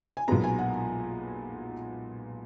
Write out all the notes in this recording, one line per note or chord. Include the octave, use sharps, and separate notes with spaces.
G#5
B1 A#2 G#3 B3 A#5
G#5
F#5